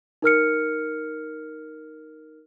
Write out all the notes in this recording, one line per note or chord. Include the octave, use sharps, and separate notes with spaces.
D#4 A#4 F6 C#7